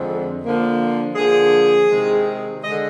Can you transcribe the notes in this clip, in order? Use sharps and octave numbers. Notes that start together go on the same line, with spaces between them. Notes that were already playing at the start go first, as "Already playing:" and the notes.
Already playing: F2 D3 G#3 C4
D3 F3 A#3
D3 F3 A#3 G#4
C3 D#3 G#3 C4
D3 G#3 D#5